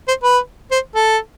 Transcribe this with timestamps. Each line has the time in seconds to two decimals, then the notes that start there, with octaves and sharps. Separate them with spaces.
0.08 C5
0.23 B4
0.71 C5
0.95 A4